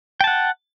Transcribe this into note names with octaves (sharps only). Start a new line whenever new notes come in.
F#5 G5 A5